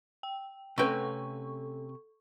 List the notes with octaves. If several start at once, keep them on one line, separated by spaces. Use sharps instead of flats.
G5
C3 A3 C#4 A4 B4 G5 C#6